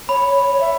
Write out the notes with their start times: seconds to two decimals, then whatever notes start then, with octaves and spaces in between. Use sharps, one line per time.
0.09 C#5 B5
0.35 C#5
0.55 C#5
0.61 E5